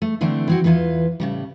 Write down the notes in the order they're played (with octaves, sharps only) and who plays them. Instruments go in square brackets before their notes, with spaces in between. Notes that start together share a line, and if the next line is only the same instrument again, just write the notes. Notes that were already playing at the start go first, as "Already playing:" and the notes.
[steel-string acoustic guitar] A3
D3 E3 A3 C4 D4
E3 C4 F#4
E2 A2 E3 F4 B4
A2 C#3 G3